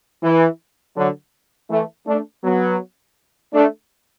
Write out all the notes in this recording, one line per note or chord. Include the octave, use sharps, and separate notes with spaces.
E3
D3 F#3
E3 A3
A3 D4
F#3 B3
A3 D4